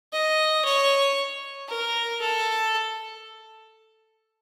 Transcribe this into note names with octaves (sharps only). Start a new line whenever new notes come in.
D#5
C#5
A#4
A4